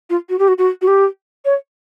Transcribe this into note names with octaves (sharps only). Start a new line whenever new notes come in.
F4
F#4
G4
F#4
F#4
F#4
G4
C#5